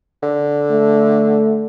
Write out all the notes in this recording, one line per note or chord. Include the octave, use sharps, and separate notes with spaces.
D3
A3